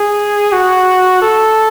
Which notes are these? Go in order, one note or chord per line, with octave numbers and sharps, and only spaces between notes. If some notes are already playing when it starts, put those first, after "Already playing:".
Already playing: G#4
F#4
A4